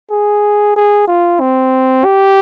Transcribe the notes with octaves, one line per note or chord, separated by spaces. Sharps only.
G#4
G#4
F4
C4
G4